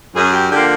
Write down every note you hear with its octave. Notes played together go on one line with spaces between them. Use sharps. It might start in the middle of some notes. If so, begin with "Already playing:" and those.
F#2 G#4
G4
D3 F3 A#3 G4